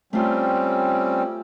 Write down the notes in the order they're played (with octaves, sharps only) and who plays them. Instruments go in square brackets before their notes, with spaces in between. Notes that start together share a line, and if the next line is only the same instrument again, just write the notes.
[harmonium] G3 C4 C#4 [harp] A3 F4